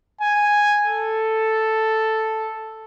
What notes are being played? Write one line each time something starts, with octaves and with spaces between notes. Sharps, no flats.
G#5
A4